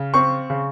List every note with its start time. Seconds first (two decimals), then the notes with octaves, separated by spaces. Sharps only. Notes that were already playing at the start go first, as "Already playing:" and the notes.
Already playing: C#3
0.14 C4 C#6
0.50 C#3